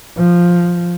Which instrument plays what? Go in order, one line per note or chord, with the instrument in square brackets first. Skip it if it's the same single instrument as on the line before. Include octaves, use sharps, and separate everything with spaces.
[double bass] F3